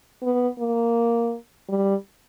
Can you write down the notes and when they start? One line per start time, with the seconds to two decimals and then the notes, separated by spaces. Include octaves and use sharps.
0.22 B3
0.59 A#3
1.69 G3